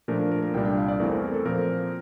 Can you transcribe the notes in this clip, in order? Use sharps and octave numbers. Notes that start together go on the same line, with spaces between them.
A#2 F3 A3 D4 A#4
A#4
A#4
A#4
C2 A#2 G3 D4 G5
G5
F5
D5
E2 E3 A3 C4 A#4
A4
A#4
A4
A#2 F3 C4 A#4